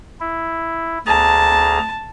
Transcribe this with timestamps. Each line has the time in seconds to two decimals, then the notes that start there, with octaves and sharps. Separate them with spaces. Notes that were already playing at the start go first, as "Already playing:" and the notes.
0.20 E4
1.07 D2 G#4 A5 A#5